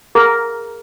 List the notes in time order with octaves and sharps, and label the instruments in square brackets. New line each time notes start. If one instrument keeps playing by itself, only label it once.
[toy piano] G#4 [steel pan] A#4